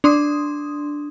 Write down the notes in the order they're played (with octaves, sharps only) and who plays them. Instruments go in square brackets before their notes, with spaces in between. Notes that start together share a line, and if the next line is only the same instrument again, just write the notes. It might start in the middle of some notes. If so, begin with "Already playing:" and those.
[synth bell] D4 C6 D#6